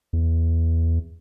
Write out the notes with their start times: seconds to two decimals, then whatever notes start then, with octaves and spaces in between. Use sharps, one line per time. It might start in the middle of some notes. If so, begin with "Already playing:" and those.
0.13 E2